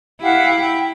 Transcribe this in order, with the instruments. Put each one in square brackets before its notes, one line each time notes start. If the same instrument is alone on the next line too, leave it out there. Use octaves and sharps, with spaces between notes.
[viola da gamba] E4 [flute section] G4 F5 F#5
[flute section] G5